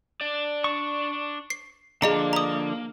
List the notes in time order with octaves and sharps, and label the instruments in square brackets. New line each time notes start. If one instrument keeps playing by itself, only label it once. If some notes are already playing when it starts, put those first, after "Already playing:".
[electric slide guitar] D4 D5
[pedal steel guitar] C#6
[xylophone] C7
[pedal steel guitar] D3 F3 D4 [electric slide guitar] A#3 [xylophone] G#4 D#5 A#5
[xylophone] A#5 D#6